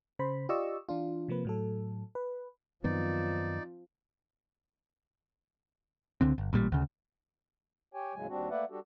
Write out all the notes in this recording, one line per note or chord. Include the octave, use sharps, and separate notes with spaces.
C#3 C5 B5
F4 G4 D5 D#5 C#6 E6
E3 D4 F4
C3 F3 A#3 B4
A2 F#3 A4
B4
F#2 D#3 F3 B3 C4 D#4 D5
C#2 D3 C4
G1
A1 A#2 G3
D2 C#3
G4 C#5 G5 G#5
D#2 A2 C#3 F#3 G#3 G#5
D#2 G3 C4 D4 F#4
A3 A#3 B4 D5 E5 F#5
G3 D4 F#4 G4 A4